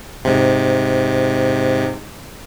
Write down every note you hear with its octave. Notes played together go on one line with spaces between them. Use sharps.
G#2 C3